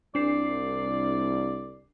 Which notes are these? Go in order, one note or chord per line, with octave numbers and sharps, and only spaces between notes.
C2 D4 D5 C7